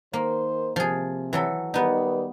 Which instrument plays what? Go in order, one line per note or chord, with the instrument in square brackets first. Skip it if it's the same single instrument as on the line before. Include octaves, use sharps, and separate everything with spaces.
[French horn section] D#3 C5 [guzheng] A#3
[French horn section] C3 [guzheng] F3 G#4
[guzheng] E3 F#3 A4
[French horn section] D#3 G3 B4 [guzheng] B3 D#4